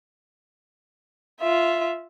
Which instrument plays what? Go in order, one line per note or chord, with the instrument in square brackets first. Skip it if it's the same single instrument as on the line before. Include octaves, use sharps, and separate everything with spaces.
[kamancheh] F4 E5